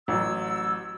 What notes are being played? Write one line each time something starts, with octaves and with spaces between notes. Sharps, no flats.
A1 F#3 E6